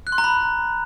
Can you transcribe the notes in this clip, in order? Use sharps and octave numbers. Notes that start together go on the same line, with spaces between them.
F#6
C6
A#5
B5